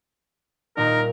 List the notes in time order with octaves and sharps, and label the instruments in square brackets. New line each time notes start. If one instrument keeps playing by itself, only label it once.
[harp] D#1 A#2 [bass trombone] D#4 [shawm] A#4